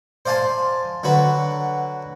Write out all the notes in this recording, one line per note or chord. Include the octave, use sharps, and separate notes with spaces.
C5 D5 F5 G#5 A5 C6
D3 F#3 F#4 B4